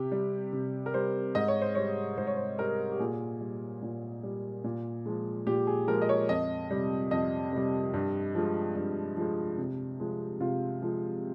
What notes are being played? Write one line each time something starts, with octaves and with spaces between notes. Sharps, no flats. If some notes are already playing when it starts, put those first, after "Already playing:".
Already playing: C3 G4
G3
C3
A#4
G3 C5
G#2 D#5
C#5
C5
G3 C#5
G#2 C5
C#5
C5
G3 A#4
G4
A#2 G#4
G3
A#2
G3
A#2
F3 G#3
A#2 G4
G#4
F3 G#3 A#4
D#5
C#5
F2 D#5
C3 G3
F2 D#5
C3 G3
G2
F3 G#3
G2
F3 G#3
C3
F3 G#3
C3 F4
F3 G#3